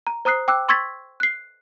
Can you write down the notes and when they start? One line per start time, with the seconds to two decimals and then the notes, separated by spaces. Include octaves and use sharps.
0.07 A#5
0.25 C5 A#5 D#6 F#6 C7
0.48 G5 D6 E6 F#6
0.69 C6 C#6 E6 G#6 A6 B6
1.20 F#6 C7